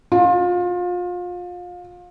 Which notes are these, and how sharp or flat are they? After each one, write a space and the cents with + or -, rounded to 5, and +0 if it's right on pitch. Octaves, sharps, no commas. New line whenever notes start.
F4 +30